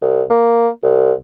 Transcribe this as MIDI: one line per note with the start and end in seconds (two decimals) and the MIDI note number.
0.02 0.23 36
0.30 0.68 58
0.83 1.12 36